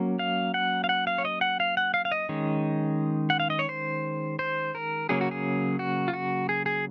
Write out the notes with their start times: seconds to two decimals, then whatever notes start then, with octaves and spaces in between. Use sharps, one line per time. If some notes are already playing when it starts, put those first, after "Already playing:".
Already playing: F#3 A#3 C#4
0.19 F5
0.54 F#5
0.84 F5
0.89 F#5
1.07 F5
1.18 C#5
1.25 D#5
1.41 F#5
1.60 F5
1.77 F#5
1.94 F5
2.05 F5
2.12 D#5
2.29 D#3 G#3 C#4
3.30 F#5
3.40 F5
3.50 D#5
3.59 C#5
3.69 C5
4.39 C5
4.75 A#4
5.09 C#3 F#3 A#3 C#4 G#4
5.21 F#4
5.31 G#4
5.79 F#4
6.08 F4
6.13 F#4
6.49 G#4
6.66 G#4